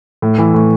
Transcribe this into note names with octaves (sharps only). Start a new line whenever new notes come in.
A2
E3
A2